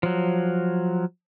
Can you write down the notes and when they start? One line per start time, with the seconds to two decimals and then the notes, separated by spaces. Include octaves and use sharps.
0.03 F3 F#3